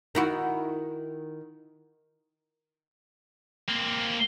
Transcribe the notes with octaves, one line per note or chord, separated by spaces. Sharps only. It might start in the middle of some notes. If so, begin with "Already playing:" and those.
D#3 E4 F#4
A#3 C4